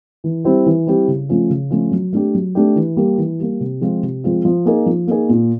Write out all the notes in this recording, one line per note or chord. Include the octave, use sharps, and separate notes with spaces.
E3
G3 C4 E4 G4
E3
G3 C4 E4 G4
C#3
F3 A3 C#4 F4
C#3
F3 A3 C#4 F4
F#3
A3 D4 G4
F#3
A3 D4 G4
E3
G3 A#3
E3
G3 A#3
C3
F3 G#3 C4 F4
C3
F3 G#3 C4 F4
F3
A#3 D#4 G#4
F3
A#3 D#4 G#4
A#2